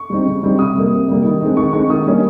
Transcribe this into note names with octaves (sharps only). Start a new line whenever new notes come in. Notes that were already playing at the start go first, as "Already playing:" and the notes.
Already playing: C#6
G3 C4 D#4
C#3
G3 C4 D#4
C3 D#6
G3 A#3
C3
G3 A#3
D#3
G#3 C4 D#4
D#3 C#6
G#3 C4 D#4 C#6
D#3 D#6
G3 A#3 C#4